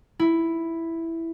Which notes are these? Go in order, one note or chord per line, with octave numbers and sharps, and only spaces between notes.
E4